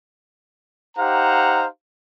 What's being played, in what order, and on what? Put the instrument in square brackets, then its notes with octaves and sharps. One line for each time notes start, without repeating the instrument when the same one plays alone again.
[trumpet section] D#4 G4 C5 F5 F#5 A#5